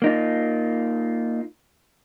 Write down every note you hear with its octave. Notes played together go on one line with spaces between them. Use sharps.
A#3 D#4 F4